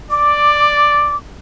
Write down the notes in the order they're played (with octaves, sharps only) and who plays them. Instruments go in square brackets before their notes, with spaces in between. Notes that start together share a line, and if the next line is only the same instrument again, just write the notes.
[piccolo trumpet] D5 [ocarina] D6